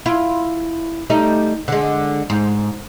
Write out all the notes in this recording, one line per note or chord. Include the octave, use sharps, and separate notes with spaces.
E4 F4
G3 A3 D#4
D3 G#3
G#2